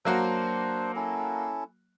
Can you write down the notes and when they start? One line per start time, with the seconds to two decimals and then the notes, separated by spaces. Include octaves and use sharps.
0.05 F#3 A#3 D4 F#4 C5
0.96 C#4 E4 A4